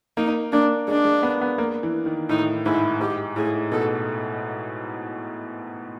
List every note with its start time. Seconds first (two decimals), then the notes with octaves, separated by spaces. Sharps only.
0.17 A#3 D#4
0.52 A#3 D4
0.88 G#3 D4
1.05 G#3
1.23 B3
1.41 B3
1.58 A#3
1.83 E3
2.06 D#3
2.29 A2 D#4
2.66 G#2 E4
3.00 G#2 G4
3.36 A2 G#4
3.72 B2 A4